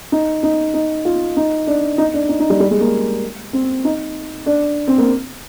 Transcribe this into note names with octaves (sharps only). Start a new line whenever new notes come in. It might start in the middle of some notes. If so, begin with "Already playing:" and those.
D#4
D#4
D#4
F4
D#4
D4
D#4
D4
D#4
D#4
G3
G3
G#3
A#3
C4
D#4
D4
C4
A#3